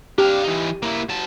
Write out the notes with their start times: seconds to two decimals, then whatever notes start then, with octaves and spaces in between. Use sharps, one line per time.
0.18 D4 G4 F5
0.44 E3 D#4
0.83 A#3 E4
1.09 F#3 A5